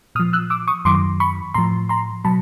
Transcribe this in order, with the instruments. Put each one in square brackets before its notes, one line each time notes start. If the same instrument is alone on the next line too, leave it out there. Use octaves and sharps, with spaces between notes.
[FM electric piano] A#2 D#6 F6
F3
E6 F#6
D6 E6
C#6 D#6
F#2 D#3 F#3 C6 D6
B5 C#6
A2 F3 A#5 C6
A#5 C6
B2 F#3 A5 B5